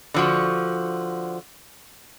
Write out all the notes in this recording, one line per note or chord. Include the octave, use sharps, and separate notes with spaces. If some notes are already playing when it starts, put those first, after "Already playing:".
D3 F3 F#4